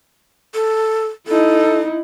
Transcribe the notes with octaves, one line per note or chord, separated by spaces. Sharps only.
A4
D#4 E4 A4